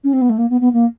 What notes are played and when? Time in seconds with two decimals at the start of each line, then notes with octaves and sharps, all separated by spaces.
0.04 C#4
0.13 C4
0.21 B3
0.29 A3
0.38 A#3
0.50 B3
0.61 B3
0.73 A#3